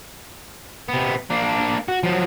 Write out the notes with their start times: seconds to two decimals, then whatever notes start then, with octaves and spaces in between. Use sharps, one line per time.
0.88 C3 B3
1.30 A#3 D4
1.88 F#4
2.03 F3 F#3